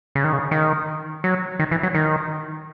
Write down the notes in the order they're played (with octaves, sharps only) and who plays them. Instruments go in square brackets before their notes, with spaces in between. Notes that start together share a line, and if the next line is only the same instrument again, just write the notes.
[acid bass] C#3
D#3
C#3
D#3
F#3
D#3
E3
F#3
D#3